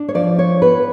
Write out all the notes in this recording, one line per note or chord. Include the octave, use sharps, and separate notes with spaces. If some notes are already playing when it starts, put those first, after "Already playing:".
Already playing: D4
C#5
F3 D5
D4 C#5
B3 B4